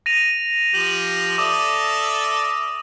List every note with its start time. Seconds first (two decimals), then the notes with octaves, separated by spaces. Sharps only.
0.06 A#6 D#7 F7
0.74 F3 G4 F#7
1.38 A4 D5 E5 D6 D#6